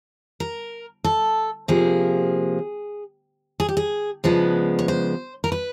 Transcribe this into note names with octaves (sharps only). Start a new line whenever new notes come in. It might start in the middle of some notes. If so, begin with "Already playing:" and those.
A#4
A4
C3 F3 A#3 G#4
G#4
G4
G#4
C#3 F3 G#3 B3 D4
C#5
C5
A#4
B4